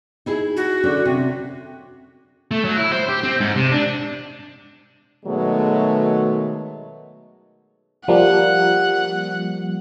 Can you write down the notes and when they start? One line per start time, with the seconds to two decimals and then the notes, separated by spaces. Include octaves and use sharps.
0.26 D#4 E4 G#4
0.57 F#4
0.84 D3 C#4
1.05 C3
2.51 A3
2.65 F#3
2.77 E4
2.93 C5
3.09 G4
3.23 C4
3.40 G#2
3.56 C3
3.72 D4
5.26 B2 D#3 F#3 G#3 A3
8.08 F3 G3 A#3 F#5